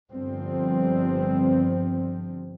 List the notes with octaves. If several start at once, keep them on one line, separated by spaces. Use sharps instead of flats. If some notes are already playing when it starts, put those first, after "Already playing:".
G1 G2 F3 C4